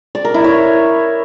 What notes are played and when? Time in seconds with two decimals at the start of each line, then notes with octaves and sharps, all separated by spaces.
0.15 D5
0.25 A#4
0.34 E4
0.44 C#5